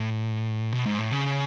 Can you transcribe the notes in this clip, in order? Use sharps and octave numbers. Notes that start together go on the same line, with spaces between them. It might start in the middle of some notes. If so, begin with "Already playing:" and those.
Already playing: A2
B2
G#2
A2
C#3